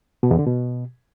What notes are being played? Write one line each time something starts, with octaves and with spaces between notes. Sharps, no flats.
B2
E2
D3
B2